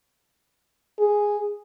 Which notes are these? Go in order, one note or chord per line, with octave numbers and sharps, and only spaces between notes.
G#4